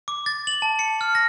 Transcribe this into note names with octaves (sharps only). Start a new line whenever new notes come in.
D6
A6
F#7
A5
C#7
F6
A#6